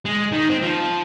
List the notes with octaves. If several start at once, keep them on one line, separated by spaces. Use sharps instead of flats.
G#3
D#3
C4
F3